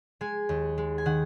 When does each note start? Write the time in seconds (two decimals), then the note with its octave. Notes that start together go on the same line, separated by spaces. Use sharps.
0.21 G#3 G#5
0.49 D#2
0.78 G#3
0.98 G#5
1.06 D#3 F#5